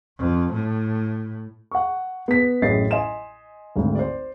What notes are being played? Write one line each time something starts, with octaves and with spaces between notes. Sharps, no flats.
F2
A2
F#5 C#6
B3 B6
A1 F#2 C#3 D#5 A6 C7
D#5 G#5 C6 E7
G#1 D2
C5 D5